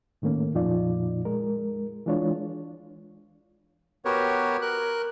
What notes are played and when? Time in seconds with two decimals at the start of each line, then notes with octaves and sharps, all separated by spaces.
0.22 A2 D#3 A3 A#3 C#4
0.55 F2 A#2 F3 D#4 F4 D5
1.25 G#3 A#4
2.06 E3 G#3 D4 F4 C#5
4.05 B3 F#4 G4 A#4 B4 C#5
4.62 A#4 F#6